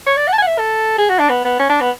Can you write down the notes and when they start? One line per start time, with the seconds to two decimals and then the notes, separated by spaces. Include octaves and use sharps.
0.06 C#5
0.16 D5
0.27 F#5
0.32 A5
0.38 G#5
0.42 F#5
0.47 E5
0.58 A4
0.98 G#4
1.09 F#4
1.19 D4
1.29 B3
1.45 B3
1.59 C#4
1.70 D4
1.81 B3